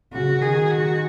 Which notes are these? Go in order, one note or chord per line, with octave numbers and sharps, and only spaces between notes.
C#3 F#4
D#3 G#4
F#4